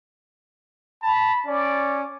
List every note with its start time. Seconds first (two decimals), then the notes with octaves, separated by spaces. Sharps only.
1.02 A5 B5
1.47 C#4 D5